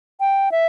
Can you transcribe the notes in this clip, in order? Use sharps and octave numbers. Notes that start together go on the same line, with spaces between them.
G5
E5